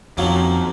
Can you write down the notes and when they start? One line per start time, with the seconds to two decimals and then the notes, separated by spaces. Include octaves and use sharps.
0.18 F2 D#3 F#3 A#3 C#4